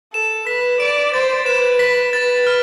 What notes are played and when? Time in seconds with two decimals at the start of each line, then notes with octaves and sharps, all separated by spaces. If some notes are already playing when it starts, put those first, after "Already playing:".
0.13 A4 E7
0.47 B4 B6
0.80 D5 D7
1.14 C5 A6
1.46 B4 E7
1.79 B6
2.13 B4 A6
2.47 F6